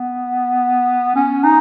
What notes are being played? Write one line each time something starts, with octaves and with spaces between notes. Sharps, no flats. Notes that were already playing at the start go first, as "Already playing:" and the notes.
Already playing: B3
C#4
D#4